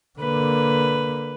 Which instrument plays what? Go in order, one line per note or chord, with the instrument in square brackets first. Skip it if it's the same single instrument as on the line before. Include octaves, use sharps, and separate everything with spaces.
[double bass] D3 A#3 [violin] B4